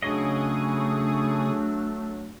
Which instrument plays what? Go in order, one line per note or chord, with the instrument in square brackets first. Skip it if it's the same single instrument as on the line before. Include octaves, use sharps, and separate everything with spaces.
[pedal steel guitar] C#3 D#5 [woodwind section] F#3 D4 [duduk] A3 [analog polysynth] G#4 C#6 D#6